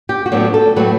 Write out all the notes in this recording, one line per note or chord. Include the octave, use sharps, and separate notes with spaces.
G4
F#4
A2 F#3 B3 D4 G4
A4
A2 F#3 A3 C4 B4